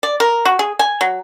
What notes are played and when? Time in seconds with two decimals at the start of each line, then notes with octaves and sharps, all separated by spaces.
0.03 D5
0.20 A#4
0.45 F#4
0.59 G#4
0.79 G#5
1.01 F#3